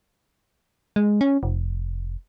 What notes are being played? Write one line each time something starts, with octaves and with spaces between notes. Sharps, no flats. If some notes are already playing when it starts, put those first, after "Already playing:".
G#3
C#4
F1